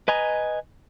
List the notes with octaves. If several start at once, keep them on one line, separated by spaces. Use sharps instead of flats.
B4 D#5 G#5 A#5